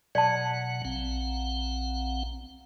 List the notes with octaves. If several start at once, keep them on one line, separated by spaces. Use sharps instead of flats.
B2 F#3 D5 F#5 A5
A#1 C4 F#5